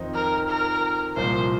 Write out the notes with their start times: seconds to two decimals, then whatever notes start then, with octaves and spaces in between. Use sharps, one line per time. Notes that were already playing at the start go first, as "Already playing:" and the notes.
Already playing: F2 D#3 C4 D#4
0.14 A#4
0.48 A#4
1.16 C2 A#2 F3 C5